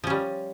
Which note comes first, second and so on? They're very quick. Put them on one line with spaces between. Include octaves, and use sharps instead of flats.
F3 C#4 G3